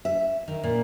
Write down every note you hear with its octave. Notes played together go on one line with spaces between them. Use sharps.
E5
D#3
A#2